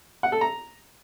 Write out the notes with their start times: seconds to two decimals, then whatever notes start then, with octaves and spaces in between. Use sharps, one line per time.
0.23 F#5
0.32 A4
0.41 A#5